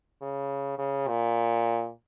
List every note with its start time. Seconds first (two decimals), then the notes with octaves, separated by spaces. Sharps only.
0.22 C#3
0.78 C#3
1.08 A#2